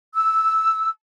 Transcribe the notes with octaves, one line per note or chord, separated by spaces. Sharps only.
E6